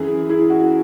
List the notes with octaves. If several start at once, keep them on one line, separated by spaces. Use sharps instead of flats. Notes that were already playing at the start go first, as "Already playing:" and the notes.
Already playing: F#2 E3 E4 G#4
E4 G#4
F#4